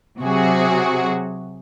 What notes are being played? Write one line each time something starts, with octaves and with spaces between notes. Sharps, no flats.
C3 F#3 F#4 G#4